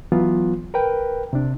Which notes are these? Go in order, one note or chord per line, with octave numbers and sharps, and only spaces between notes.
E3 F#3 B3 F4
A#4 B4 G5
C3 D4